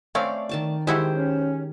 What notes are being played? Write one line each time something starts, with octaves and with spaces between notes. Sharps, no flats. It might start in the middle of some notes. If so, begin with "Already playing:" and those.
A3 C4 C#4 D5 F5
D#3 A5 D6
D#3 G#3 E4 F#4 G4 C5
C#4